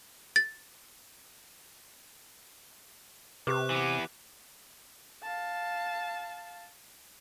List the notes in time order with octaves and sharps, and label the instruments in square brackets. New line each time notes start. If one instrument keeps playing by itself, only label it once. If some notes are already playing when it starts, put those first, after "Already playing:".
[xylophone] A6
[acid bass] C3 [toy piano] G4 B4 [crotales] D6 F#6
[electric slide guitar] E3 B3
[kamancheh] F5 A5